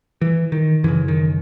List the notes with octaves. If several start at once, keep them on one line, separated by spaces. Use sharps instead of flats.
E3
D#3
F#2 C#3 E3
D#3